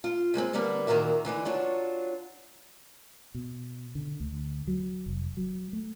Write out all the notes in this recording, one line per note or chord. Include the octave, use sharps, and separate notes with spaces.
F4
F3 G#3 A#3 C4
D3 G3 A#3 B3 D4
A#2 D#3 A#3 F#4 A#4 E5
D3 E3 D4 D#4
F#3 D4 F4 C#5
B2
D3
D2
F#3
F1
F#3
A3